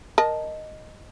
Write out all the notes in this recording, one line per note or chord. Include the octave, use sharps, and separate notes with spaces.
A#4 D#5 A5